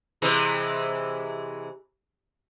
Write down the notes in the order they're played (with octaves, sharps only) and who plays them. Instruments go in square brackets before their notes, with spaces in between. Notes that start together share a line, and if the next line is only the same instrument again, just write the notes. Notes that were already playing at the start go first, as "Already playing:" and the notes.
[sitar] C3 E3 G#3